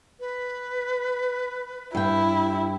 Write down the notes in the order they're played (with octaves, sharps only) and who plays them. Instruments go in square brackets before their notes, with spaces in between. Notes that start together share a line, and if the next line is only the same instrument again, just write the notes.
[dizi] B4
[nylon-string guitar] G2 G5 [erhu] E4